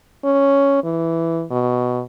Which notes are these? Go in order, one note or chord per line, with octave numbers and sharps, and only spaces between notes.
C#4
E3
B2